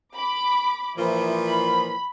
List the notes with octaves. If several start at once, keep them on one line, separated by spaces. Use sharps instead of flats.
B5 D6
A#2 E3 F3 E4
B5